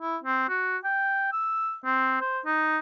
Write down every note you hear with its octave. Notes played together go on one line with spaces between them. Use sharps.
E4
C4
F#4
G5
E6
C4
C5
D#4